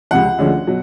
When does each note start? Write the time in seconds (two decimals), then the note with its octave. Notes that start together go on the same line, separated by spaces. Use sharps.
0.11 C#2 C3 F3 F#5
0.38 D2 D3 F3 G#3 C#4
0.67 B2 F#3